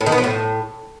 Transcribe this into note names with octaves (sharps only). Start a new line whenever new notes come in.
A2
D#3
B3
F3
A2